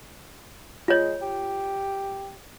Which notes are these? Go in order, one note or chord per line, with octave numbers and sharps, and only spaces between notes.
G#3 F4 C#5
G4